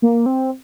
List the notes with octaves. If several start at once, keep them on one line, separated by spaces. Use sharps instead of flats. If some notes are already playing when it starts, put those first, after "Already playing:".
A#3
C4